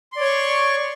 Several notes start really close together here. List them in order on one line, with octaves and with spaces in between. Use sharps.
C6 D5 C#5 C#6